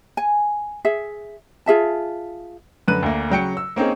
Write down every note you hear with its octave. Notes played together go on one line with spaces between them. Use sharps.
G#5
G#4 E5
F4 G#4 E5 A5
F#2 D3 B4 F#6 D#7
D2 A#3
C#3 F#3 G5 C#7
E6
A#3 C4 C#4 D#4 G#4